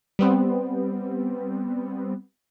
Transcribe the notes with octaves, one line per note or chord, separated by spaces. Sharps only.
G3 B3 C4